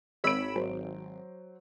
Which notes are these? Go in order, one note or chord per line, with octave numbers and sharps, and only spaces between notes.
G#1 C#5 B5 E6 D7
G#1 F#3 C5